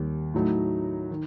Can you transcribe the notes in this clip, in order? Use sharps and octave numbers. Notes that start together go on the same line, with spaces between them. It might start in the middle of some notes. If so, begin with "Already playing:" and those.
Already playing: D#2 D#3 G3
A2 F#3 A3 D#4
D#3